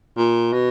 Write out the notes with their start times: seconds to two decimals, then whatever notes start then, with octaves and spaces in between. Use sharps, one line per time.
0.17 A#2
0.53 B2